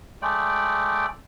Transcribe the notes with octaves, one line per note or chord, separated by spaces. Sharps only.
G#3 A3 D5 G5